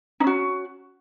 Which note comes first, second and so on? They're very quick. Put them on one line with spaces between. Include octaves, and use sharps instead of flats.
D#4 C#4 F#4